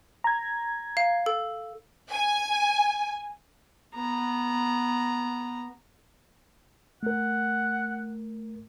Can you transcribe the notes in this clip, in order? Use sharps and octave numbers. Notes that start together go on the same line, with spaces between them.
A#5 G#6
F5
A4
G#5
B3 A#5
A3 A#4 F#5